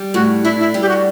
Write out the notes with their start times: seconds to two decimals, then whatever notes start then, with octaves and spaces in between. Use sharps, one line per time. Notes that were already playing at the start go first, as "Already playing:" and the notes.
Already playing: G3
0.14 A2 F#4
0.43 D4 E4
0.60 E4
0.74 G3
0.81 G4
0.89 F#4